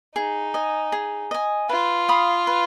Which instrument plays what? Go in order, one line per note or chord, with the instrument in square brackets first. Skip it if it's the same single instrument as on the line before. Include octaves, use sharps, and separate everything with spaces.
[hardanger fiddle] D#4 [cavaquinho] G#4
[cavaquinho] D#5 G#5
G#4
D#5 G#5
[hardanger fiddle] F4 [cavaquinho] B4
[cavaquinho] F5 B5 D#6
B4